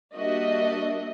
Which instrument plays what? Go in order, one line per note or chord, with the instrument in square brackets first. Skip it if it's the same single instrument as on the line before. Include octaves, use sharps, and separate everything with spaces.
[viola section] G3 A#3 D4 F#4 D#5 E5